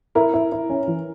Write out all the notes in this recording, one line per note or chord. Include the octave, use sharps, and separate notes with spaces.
E4 A#4
E4
E4
C#4
E3